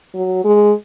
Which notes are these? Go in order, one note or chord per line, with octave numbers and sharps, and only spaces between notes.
F#3
G#3